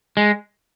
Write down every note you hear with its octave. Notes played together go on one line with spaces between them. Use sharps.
G#3